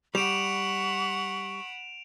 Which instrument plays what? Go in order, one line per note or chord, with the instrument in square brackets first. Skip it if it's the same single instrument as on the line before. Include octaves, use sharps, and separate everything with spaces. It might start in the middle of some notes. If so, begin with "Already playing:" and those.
[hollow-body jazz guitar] G3 [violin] F#5 B5 [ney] C#6 [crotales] D7 E7 F7